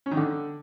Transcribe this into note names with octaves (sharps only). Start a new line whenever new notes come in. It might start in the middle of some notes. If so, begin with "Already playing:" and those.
C#4
D#3
D3